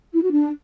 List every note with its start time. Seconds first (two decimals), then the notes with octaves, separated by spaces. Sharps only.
0.13 E4
0.22 F#4
0.31 D4